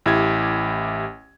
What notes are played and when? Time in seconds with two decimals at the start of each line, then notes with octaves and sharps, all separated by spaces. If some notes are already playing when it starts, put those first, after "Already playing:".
0.06 A1 E4 G4 G#6